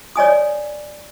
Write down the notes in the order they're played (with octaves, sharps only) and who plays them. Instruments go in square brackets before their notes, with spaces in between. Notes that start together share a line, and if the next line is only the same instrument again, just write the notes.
[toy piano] C#5 D5 G#5 D#6